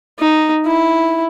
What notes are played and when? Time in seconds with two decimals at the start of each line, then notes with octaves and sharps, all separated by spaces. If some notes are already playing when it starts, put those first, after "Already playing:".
0.19 D#4
0.66 E4